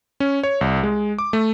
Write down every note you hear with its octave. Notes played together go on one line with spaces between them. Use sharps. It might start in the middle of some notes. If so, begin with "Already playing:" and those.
C#4
C#5
C2
G#3
D6
A3